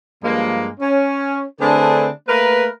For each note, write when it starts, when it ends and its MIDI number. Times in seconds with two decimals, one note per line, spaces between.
0.23 0.69 43
0.23 0.69 53
0.23 0.69 56
0.23 0.69 58
0.80 1.42 61
1.60 2.08 50
1.60 2.08 57
1.60 2.08 60
1.60 2.08 62
1.60 2.08 68
1.60 2.08 71
2.28 2.67 57
2.28 2.67 58
2.28 2.67 70
2.28 2.67 71